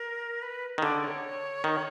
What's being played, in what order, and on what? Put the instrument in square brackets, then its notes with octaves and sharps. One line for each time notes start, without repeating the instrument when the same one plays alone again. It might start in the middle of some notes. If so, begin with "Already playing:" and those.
Already playing: [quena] A#4
B4
[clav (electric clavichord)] D#3
[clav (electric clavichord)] D3 [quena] D5
[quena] C#5
[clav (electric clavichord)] D#3